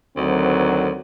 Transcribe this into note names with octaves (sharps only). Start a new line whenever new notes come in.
D2 D#3 F#3 C4